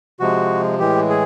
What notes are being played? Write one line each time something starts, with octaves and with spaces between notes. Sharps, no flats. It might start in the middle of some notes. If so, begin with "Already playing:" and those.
C3 F3 G#3 F#4
A2 E3 G#3 G4
G#4